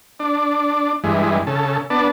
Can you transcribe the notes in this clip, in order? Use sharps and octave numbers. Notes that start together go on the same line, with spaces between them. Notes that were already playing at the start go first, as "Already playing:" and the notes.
D4
G2 E3 G#3
C#3 A4
B3 D4 A5